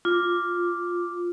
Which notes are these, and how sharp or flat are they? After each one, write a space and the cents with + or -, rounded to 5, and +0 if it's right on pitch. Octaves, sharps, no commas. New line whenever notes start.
F4 +0 D6 +0